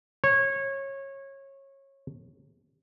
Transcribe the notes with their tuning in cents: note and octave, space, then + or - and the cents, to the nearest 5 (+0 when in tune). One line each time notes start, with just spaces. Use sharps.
C#5 -20